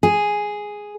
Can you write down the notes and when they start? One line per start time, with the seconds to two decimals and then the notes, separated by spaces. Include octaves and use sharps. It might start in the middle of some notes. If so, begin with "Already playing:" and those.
0.03 G#4